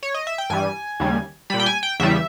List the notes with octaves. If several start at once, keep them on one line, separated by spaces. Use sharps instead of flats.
C#5
D#5
E5
G5
G2 E3 G3 G#5
D#2 C#3 G3
A#2 G3 B5
G5
G#5
G5
E2 C#3 E3 G3 E5